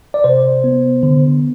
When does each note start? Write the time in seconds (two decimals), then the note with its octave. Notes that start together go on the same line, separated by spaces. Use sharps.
0.14 D5
0.24 C3 C5
0.64 B3
1.03 D3